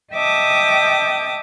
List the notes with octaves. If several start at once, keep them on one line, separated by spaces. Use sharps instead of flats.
D#5 E5 G5 A5 D6 D#6